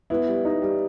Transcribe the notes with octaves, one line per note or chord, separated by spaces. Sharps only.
B3 E4
G3
D#4
G3